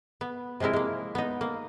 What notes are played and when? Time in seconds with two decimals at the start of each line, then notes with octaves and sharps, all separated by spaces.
0.21 B3
0.60 C3 F3 G#3 E4 A#4
0.73 G#3 A#3
1.15 B3 D#4
1.41 A#3